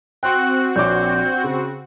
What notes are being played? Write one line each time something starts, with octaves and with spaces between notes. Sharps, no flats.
C4 F#4 G5 C6 F#6
A#1 C#5 D6 G6
C#3